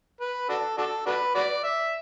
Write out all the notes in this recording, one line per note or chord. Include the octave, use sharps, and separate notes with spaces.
B4
D4 F#4 A4
D4 F#4 A4
D4 F#4 B4
F#4 B4 D5
E5